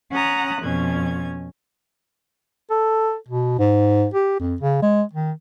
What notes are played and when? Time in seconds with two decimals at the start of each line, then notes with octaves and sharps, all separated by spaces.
0.12 C#4 F#5 A#5 D#6 F#6
0.62 F2 B2 C#4 G#6
2.70 A4
3.29 B2
3.59 G#2
4.14 G4
4.39 F2
4.60 C#3
4.82 G#3
5.13 D#3